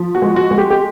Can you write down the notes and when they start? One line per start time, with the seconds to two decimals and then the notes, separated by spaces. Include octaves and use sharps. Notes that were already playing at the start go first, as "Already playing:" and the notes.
Already playing: F3
0.15 F#4
0.22 G#3
0.36 F#4
0.51 G#3
0.58 G4
0.71 G4